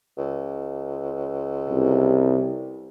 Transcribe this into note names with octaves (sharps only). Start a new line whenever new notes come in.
C#2
C2